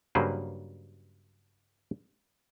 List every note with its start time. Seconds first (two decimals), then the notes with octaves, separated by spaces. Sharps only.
0.15 G2 C#3 F#3 A#3 B4 C5